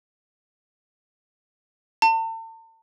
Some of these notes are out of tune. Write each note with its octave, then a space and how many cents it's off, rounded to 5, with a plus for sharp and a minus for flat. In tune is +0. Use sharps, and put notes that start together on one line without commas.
A5 +40